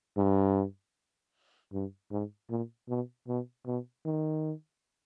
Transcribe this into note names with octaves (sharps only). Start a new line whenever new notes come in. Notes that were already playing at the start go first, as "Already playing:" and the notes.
G2
G2
G#2
A#2
B2
B2
B2
D#3